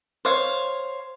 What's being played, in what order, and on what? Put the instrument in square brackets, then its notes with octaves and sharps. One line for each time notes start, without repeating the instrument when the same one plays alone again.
[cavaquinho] C5 C#5 F5